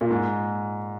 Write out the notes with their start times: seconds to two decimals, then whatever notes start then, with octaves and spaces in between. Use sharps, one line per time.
0.01 A#2
0.11 G#2